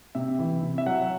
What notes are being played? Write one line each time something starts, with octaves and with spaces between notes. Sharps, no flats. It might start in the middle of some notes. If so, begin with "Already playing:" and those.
C3 E5
E3
C3
E5
F#3 F#5